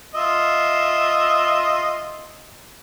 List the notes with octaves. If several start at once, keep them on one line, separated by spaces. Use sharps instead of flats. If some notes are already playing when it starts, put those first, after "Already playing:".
F4 D#5 E5